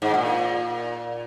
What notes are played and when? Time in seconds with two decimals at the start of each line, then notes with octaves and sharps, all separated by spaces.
0.02 G#2
0.14 A#2